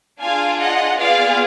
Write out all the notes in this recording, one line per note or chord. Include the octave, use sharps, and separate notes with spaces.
D4 F4 G#4 F5 G#5
D#5 F#5
B3 F4 G#4 D5 F5